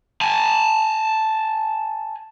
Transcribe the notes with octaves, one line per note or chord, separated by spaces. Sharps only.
G#5 A5